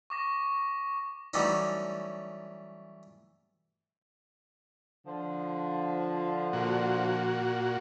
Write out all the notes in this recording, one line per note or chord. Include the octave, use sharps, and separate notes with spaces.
C#6 D6 A#6
E3 F#3 G3 A3 C#4 D#4
D3 F3
A#2 F#4